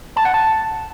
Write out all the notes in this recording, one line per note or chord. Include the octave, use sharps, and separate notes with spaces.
A5
F#5
A5